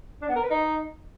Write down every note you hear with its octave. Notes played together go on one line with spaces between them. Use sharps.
D4
B3
A#4
B4
D#4